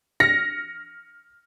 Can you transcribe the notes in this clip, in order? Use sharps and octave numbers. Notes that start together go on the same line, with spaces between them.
F6 A#6 C#7